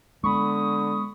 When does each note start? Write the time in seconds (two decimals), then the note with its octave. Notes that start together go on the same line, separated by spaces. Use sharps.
0.24 D3 G#3 B3 B5 C#6 D#6